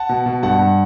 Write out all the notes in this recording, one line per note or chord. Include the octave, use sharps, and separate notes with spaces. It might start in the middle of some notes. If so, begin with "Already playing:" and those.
Already playing: F#5 A5
B2
B2
G2 F#5 A5
G2